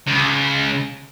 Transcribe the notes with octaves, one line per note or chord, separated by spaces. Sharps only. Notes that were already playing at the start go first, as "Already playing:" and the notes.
C#2